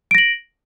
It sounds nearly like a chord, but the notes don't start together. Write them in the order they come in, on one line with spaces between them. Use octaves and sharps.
D7 A#6 F#7